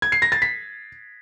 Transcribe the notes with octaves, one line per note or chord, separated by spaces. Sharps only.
G#6
C7
A#6
A6
B6